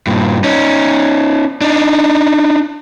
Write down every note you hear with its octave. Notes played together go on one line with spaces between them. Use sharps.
G2 A#2
C#4 D#4
D4 D#4